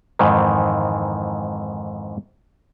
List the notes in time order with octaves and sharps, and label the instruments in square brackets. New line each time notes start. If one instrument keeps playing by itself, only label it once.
[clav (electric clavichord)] F2 G#2 D#3 E3